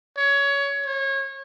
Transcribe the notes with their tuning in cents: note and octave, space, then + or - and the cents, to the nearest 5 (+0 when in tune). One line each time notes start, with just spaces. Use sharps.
C#5 +20
C#5 -25